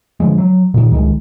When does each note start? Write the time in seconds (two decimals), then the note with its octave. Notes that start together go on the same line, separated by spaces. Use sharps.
0.20 D3 F3 G#3
0.38 F#3
0.74 A#2 D#3
0.91 C#2 D#3 G3 G#3